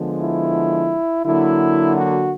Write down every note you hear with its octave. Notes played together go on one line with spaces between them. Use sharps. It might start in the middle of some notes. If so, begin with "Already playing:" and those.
Already playing: D3 F3 G#3 B3
E4
D3 F#3 A#3 E4
F#4